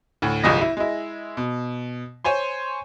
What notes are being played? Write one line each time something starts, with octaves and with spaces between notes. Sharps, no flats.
D2 A2
G1 C2 F3 G#3 D#6 A#6
E4
G#3 E4
B2
C5 C#5 G#5 C6